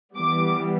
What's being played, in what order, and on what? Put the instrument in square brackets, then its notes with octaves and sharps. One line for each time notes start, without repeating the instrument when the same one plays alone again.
[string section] E3 G3 B3 D6